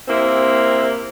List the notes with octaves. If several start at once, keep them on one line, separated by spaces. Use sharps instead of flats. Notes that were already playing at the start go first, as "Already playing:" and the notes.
C3 A#3 C4 E4